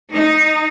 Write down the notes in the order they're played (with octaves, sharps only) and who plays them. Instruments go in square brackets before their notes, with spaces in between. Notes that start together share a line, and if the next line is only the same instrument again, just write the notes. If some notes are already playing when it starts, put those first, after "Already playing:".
[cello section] D#4